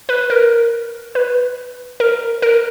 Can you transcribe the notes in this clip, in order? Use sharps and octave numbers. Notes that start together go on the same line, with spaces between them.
B4
A#4
B4
A#4
A#4